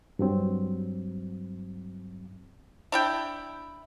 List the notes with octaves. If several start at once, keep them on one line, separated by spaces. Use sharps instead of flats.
G2 F#3 C4
D4 E4 G5